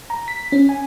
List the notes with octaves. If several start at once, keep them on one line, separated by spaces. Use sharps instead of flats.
A#5
B6
C#4
G#5